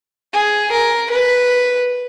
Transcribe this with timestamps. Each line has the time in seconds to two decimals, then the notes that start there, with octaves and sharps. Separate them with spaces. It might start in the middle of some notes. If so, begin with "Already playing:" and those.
0.33 G#4
0.72 A#4
1.10 B4